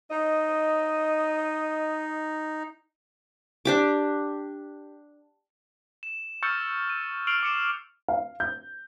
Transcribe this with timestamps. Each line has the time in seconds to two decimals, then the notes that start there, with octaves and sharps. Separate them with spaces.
0.11 D#4 D#5
3.65 D4 G4 D6
6.03 E7
6.43 C#6 E6 F6 G6 A6 C#7
6.90 D#7
7.27 C#6 F6 C7 D7 F7 F#7
7.43 D6 C#7 E7
8.08 F5
8.40 G6